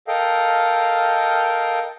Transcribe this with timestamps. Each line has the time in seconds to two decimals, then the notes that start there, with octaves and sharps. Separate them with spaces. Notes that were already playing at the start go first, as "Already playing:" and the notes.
0.08 A4 A#4 D#5 F5 G5